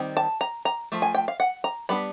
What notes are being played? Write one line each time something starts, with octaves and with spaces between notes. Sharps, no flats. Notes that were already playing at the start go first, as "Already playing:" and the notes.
Already playing: D#3 G3 C4
A5
A#5
A#5
F3 A3
G#5
G5
F5
F#5
A#5
G3 B3 D4 B5